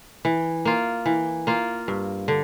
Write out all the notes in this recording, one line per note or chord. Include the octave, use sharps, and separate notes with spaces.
E3
A#3 F4
E3
A#3 F4
G2
D3